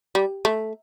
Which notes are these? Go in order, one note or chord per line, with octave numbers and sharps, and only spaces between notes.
G3
A3